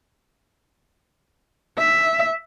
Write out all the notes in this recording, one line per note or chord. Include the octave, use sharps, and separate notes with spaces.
E5